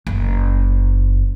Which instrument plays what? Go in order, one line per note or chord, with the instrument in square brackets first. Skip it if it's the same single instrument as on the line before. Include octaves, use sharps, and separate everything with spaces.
[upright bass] F#1